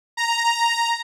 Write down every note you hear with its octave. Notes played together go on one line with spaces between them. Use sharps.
A#5